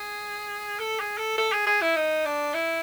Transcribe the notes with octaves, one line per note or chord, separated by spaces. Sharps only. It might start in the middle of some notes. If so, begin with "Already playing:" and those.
Already playing: G#4
A4
G#4
A4
A4
G#4
G#4
E4
D#4
D4
E4